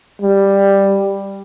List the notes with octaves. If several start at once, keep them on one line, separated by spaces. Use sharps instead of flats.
G3